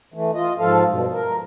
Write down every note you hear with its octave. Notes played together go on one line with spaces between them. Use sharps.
E3 A3
F4 D#5
G#2 F3 F4 A4 F5
G2 B2
A#4